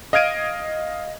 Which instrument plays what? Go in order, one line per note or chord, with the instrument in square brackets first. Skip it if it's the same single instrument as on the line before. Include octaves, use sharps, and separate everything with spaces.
[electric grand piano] D#5 F5 F6 G#6 D7 D#7